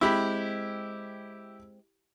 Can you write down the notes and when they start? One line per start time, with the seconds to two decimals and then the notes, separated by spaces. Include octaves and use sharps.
0.01 G#3 C4 E4 G4 B5